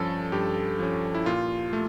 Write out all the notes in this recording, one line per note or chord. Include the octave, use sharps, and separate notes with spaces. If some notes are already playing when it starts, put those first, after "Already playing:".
Already playing: G2 F3 C#4 A4
G2 G4
F3 C#4
E4
A#2 F4
A3